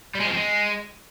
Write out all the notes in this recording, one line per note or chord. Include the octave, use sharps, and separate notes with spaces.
G3
G#3
F3
C4
G#3